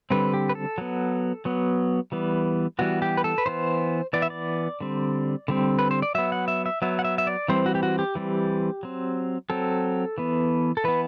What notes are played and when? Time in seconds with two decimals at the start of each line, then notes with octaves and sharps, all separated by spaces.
0.10 D3 G3 C4 B4
0.34 G4
0.49 B4
0.55 A4
0.78 F#3 B3
1.45 F#3 B3
2.12 E3 G3 B3
2.79 E3 G3 B3 F#4
3.02 G4
3.17 B4
3.24 A4
3.38 B4
3.46 E3 B3 C5
4.13 E3 B3 D5
4.22 E5
4.30 D5
4.81 D3 G3 C4
5.48 D3 G3 C4
5.79 B4
5.91 C5
6.02 D5
6.15 F#3 B3 E5
6.32 F#5
6.48 E5
6.66 E5
6.82 F#3 B3 E5
6.99 F#5
7.04 E5
7.18 E5
7.27 D5
7.48 E3 G3 C4 C5
7.66 F#4
7.75 G4
7.83 F#4
7.99 G4
8.15 E3 G3 C4
8.83 F#3 C4
9.50 F#3 C4 A4
10.18 E3 B3
10.77 A4
10.84 E3 B3 B4